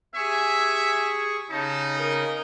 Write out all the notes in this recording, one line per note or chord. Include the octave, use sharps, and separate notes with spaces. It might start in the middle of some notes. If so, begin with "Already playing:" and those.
G4 G#4 E5 G#5 C#6
C#3 D#4 A5
A#4 D#5